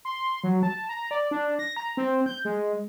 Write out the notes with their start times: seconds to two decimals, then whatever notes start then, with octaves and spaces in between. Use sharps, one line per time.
0.05 C6
0.44 F#3
0.63 A5
0.89 A#5
1.11 D5
1.31 D4
1.59 A#6
1.77 A#5
1.97 C4
2.26 G6
2.45 G#3